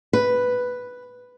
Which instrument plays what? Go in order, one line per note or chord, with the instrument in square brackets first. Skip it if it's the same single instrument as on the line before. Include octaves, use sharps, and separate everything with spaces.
[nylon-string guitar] B4